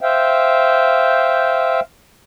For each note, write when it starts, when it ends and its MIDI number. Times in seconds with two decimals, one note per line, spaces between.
0.01 1.80 72
0.01 1.80 76
0.01 1.80 77
0.01 1.80 79